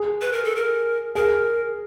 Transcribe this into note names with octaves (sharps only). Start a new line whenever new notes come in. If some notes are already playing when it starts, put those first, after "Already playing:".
Already playing: G#4
B4
A#4
A4
A#4
G#4 A#4